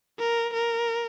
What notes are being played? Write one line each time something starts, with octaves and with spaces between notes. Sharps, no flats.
A#4
A#4